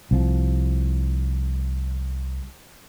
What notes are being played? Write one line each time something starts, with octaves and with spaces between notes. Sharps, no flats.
C2 F3